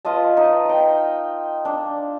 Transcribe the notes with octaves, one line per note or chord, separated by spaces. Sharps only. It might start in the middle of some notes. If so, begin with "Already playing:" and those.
F4 B4 D#5 A5
D#4
G5 A#5
D4